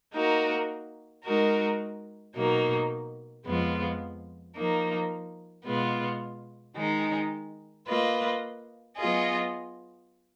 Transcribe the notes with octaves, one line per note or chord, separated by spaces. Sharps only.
A#3 D#4 F#4 A#4
G#3 D#4 F#4 A#4
B2 F#3 A#3 D#4
F2 F3 G#3 B3 F4
F3 A#3 D#4
B2 G#3 B3 F4
D#3 G#3 D#4
A#3 F4 B4 D#5
F#3 B3 F4 G#4 D#5